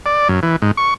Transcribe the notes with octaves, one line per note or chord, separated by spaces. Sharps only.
D5
F#2
E3
G#2
C#6